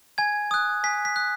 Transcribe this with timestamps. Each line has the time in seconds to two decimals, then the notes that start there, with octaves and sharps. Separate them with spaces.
0.18 G#5 G#6
0.51 D#6 F#6
0.84 G#5 B6
1.05 B6
1.16 D#6 F#6